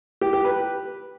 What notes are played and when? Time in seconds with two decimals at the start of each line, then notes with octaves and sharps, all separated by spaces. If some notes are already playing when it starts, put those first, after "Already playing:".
0.21 G4
0.33 G4
0.45 B4